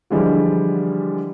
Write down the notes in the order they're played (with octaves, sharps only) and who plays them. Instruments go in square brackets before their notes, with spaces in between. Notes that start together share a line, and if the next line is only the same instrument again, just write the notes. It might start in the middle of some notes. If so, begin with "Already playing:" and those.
[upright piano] D3 E3 F3 G3 G#3